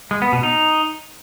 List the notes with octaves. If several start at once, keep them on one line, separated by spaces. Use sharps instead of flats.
G#3
B3
B2
D#4